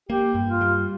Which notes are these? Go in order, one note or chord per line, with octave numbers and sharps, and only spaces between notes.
A#3 G4
G2
F4
G3